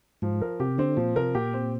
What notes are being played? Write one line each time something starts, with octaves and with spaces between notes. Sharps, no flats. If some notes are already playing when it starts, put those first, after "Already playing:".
G#2 F3
A#4
C3 G4
D3 C4
A#2 F3
C3 A#4
A#2 G4
C4